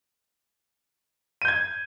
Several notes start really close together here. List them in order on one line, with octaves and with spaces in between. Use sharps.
D#7 G6 G#6